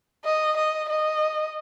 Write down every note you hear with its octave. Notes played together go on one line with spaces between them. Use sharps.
D#5
D#5
D#5